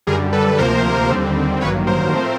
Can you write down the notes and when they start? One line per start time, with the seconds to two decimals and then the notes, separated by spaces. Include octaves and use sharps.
0.07 F#2 D3 G3 G#4 A#4
0.33 A4 B4
0.58 D2 C3 F3 A#3 A#4 C5
1.09 D#2 D3 G3 C4
1.61 A1 G2 D#3 F#3 A#3 B4 C#5
1.87 A#4 C5
2.13 A2 F3 A3 C4